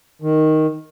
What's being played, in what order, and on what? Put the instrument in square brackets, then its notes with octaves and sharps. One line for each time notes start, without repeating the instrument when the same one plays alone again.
[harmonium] D#3